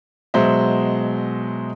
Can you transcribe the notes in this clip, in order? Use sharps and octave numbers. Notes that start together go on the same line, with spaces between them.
B2 F#3 G#3 C5 D#5 E5